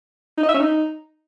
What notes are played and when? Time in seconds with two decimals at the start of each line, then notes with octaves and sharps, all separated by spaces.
0.38 D#4
0.43 D#5
0.49 E5
0.54 C#4
0.60 D#4